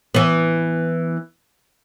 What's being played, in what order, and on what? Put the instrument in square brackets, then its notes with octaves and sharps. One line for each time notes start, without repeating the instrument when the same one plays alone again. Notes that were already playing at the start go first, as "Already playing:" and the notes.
[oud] E3 B3